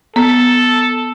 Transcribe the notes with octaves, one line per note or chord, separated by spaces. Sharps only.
B3 A4